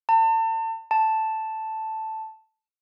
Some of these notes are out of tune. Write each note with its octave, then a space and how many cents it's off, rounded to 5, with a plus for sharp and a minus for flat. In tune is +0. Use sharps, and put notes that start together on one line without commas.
A5 +35
A5 +0